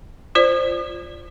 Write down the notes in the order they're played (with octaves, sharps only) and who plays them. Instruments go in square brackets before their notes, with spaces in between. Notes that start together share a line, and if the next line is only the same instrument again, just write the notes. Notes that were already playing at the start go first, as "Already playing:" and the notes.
[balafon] F4 C5 D5